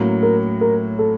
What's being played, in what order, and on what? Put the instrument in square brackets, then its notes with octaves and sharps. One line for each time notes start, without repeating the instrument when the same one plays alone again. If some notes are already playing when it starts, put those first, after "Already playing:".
Already playing: [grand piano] A2 F#3 A#3 C#4
[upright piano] A#4
A#4
A4